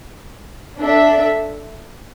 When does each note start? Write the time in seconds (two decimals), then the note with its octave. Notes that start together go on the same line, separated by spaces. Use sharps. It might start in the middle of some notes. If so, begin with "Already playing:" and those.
0.79 D4 A4 E5